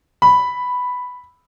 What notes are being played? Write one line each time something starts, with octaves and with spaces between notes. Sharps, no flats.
B5